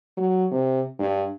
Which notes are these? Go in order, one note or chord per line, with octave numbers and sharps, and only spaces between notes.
F#3
C3
G2